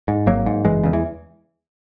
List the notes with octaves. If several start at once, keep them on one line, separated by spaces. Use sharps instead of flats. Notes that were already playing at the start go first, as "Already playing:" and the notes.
G#2
G#1 F#3 A#3
G#2
F#1 E3 G#3
E2 C#3
E3